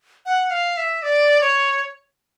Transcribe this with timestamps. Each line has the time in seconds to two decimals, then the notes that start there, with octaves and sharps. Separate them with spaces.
0.26 F#5
0.50 F5
0.77 E5
1.02 D5
1.41 C#5